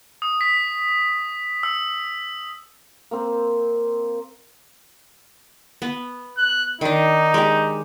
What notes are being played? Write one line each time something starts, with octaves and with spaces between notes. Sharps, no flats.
D#6
B6
E6
A#3 C4
B3
F#6
D#3 D4 D#4
G#3 G4